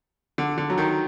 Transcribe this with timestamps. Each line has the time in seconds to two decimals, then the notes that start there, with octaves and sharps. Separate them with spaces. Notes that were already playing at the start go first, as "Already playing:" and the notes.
0.38 D3
0.58 D3
0.70 F#3
0.78 D#3